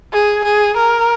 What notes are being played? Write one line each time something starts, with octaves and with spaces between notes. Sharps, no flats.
G#4
G#4
A#4